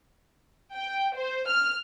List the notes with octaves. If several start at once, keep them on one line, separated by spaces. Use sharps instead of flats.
G5
C5
F6